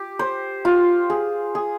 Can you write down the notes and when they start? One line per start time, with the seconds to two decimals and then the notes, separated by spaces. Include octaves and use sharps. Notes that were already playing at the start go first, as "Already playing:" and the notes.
Already playing: G4
0.19 C5
0.65 F4
1.10 G#4
1.55 G#4